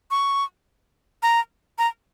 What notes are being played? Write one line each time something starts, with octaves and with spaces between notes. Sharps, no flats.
C#6
A#5
A#5